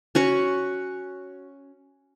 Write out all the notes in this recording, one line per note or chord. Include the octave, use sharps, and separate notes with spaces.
C#4 F#4 C#6